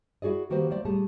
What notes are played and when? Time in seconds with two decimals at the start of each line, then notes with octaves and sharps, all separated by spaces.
0.22 E4 F#4 G#4 D5 D#5
0.50 D#3 A#3 F#4 G4 B4 C5
0.70 A3 A#3 C5 D5
0.85 A#2 G3 A3 G#4 A5